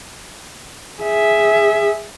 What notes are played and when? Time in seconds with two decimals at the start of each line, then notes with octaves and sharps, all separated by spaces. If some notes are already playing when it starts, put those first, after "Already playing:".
1.02 G#4 E5